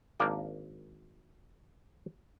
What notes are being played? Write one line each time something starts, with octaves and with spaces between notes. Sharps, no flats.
G#1 A#3 D4 G5